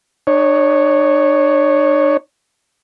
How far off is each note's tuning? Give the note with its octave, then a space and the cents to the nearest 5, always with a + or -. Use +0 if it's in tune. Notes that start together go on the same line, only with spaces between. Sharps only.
D4 +40 C#5 +0